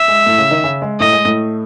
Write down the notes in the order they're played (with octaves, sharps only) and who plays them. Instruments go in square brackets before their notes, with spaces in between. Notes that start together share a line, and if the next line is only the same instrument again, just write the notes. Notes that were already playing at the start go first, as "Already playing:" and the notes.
Already playing: [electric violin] E5
[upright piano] G#3
A2 A3
C#3 C#4
D#3 D#4
C#3 C#4
G#3
[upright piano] A2 A3 [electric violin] D#5
[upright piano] G#3
A2 A3